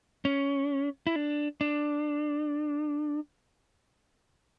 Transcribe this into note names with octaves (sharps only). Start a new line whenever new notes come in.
C#4
E4
D4
D4